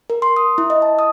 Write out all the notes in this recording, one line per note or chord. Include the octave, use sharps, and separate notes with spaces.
A#4
C6
D#6
E4
D#5
A5
D#6